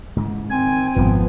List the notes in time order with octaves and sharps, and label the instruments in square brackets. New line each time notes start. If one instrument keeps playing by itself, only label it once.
[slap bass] G#2 C#3 E3
[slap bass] D#3 [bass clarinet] C4 [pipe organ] G#5
[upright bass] G#1 [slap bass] F2 G3 G#3 [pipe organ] F3 B3